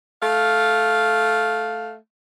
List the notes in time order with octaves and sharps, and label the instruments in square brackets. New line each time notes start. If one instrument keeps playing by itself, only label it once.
[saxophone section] A3 F5